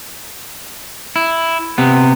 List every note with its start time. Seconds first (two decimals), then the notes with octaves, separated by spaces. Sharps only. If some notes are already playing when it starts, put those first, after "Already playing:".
1.16 E4
1.78 C3 B3